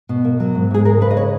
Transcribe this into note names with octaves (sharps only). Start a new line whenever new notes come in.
B2
A#3
F#3
G#2
G#2 G#4
G#3 A#4
C#3 B4
D#5
C#5